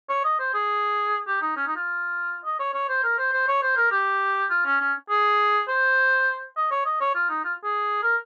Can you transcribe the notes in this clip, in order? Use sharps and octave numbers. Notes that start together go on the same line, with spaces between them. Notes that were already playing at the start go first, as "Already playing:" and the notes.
C#5
D#5
C5
G#4
G4
D#4
C#4
D#4
F4
D#5
C#5
C#5
C5
A#4
C5
C5
C#5
C5
A#4
G4
F4
C#4
C#4
G#4
C5
D#5
C#5
D#5
C#5
F4
D#4
F4
G#4
A#4